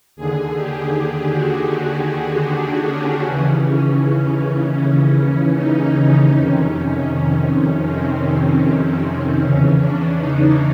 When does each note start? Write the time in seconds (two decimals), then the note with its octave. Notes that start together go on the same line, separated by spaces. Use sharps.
0.16 D#2 D3 G#4
0.54 G4
0.93 G4
1.31 F#4
2.47 D4
2.84 C#4
3.24 D#2 C#3 E3 C#4
5.55 D#4
5.93 C#4
6.32 F2 C3 D#3
7.86 C4
9.39 E2 C#3 E3 C#4
9.78 D4
10.17 D#4